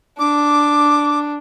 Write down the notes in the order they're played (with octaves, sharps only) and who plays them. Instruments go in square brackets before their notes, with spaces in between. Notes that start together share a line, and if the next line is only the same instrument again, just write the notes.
[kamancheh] D4 [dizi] D6